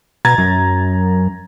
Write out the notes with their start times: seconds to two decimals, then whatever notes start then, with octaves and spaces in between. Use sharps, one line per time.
0.25 B2 A#5 G#6 A6
0.38 F#2